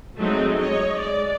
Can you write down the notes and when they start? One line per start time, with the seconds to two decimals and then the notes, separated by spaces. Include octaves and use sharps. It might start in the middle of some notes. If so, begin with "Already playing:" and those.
0.19 F#3 G#3 A3 C4 D#4
0.57 C#5 D#5
0.98 G#3 D5